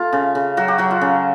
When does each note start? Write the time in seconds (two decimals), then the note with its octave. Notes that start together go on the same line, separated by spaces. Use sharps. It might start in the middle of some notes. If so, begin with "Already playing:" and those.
Already playing: A3 F4
0.13 C#3
0.35 C#3
0.57 F#3 F#4
0.68 G4
0.78 F#3 F#4
0.91 F4
1.01 C#3